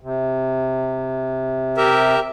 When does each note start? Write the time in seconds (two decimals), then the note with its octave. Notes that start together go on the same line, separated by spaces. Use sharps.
0.01 C3
1.77 G4 A#4 E5